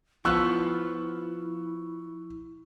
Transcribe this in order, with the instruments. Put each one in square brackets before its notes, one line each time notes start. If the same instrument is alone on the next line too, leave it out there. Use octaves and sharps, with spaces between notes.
[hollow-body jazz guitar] F3 B3 F4 [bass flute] E4 [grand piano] C#6 E6 F#6